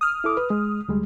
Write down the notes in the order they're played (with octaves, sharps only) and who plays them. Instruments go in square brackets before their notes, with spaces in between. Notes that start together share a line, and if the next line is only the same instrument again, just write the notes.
[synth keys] D#6 F6
[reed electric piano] E4 A4 D6
B4
G#3
D2 G3 G#3